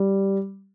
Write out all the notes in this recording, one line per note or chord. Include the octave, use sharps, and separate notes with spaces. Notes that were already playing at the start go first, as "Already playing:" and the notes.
Already playing: G3